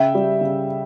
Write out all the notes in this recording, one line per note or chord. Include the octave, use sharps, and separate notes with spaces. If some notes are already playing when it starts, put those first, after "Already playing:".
Already playing: C#3 E5 G5
G3
C#3